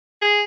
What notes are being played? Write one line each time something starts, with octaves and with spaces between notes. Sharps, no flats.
G#4